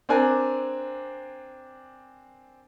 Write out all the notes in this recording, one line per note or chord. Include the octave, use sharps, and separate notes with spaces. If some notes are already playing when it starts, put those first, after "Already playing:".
C4 D4 A#4 G#5 D6 F#6